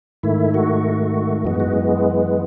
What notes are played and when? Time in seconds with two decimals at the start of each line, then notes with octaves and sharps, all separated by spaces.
0.23 G#2 D#3 A3 E4
0.54 F#4
1.44 F#2 E3 G#3 B3 F#4
1.60 F#4